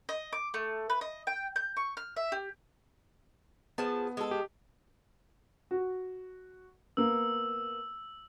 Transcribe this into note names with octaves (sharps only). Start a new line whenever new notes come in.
D#5
D6
A3
B4
D#5
G5
G6
C#6
F6
E5
G4
F3 B3 G#4 A5
G#3 A4
G4
F#4
A#3 B3 E6